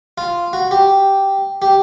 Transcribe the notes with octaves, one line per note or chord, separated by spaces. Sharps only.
F4
F#4
G4
G4